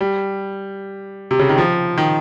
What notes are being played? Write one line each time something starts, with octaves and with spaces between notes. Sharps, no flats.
G3
C3
C#3
D#3
F3
D#3